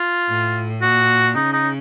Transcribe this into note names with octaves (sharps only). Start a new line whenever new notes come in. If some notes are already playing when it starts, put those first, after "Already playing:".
Already playing: F4
A2
A#2 F#4
C#3 D#4
D#4